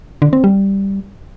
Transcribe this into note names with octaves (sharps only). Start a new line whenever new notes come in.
D3
C4
G3